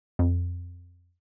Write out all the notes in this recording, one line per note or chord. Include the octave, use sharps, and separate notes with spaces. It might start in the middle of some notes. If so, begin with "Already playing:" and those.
F2